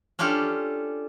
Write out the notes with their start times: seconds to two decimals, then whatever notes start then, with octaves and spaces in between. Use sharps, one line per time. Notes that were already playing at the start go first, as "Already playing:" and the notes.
0.19 C#4 D4 F4 G4 A4